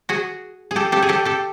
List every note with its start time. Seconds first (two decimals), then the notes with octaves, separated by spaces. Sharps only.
0.09 F#4 G#4
0.71 G#4
0.76 G4 A4
0.92 G4 A4
1.02 G#4
1.09 G4 A4
1.25 G4 A4